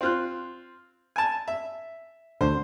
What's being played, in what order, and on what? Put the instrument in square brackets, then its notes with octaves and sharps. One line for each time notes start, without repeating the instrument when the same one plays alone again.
[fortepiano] C4 F4 F#6
G#5 A5
E5
[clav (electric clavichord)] D2 D3 [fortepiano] C5